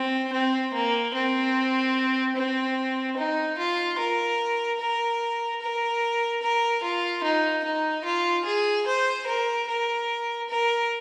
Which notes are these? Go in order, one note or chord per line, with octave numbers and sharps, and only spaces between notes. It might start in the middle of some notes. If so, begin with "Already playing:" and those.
Already playing: C4
C4
A#3
C4
C4
D#4
F4
A#4
A#4
A#4
A#4
F4
D#4
D#4
F4
G#4
C5
A#4
A#4
A#4